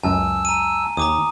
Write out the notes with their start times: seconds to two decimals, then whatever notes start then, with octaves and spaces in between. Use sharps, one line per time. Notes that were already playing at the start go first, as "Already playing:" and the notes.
0.03 C#2 F#2 G#5 A5 E6
0.45 A#5 D#7
0.97 D#2 A#5 D6 D#6